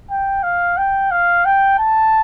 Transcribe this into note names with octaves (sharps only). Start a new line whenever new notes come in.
G5
F5
G5
F5
G5
A5